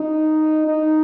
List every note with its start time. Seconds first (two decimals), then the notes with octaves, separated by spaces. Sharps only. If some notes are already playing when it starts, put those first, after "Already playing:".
Already playing: D#4
0.68 D#4